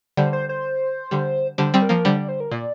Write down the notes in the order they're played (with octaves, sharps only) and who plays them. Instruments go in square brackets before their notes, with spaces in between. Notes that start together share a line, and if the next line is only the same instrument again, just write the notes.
[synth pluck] D3 G3 [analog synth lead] C5
[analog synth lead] C5
C5
[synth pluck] D3 G3
[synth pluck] D3 G3 [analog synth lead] C5
[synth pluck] G3 C4
[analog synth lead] A#4
[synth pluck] F3 A#3
[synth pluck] D3 G3 [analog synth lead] C5
[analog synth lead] D5
C5
A#4
[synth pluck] A#2 [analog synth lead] D5